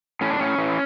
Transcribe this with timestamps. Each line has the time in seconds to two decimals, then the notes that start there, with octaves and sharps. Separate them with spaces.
0.21 A2 C#4
0.30 D4
0.39 A2 C#4
0.58 E3